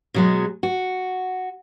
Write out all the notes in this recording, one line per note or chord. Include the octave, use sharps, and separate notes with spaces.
B2 F#3 G#3
F#4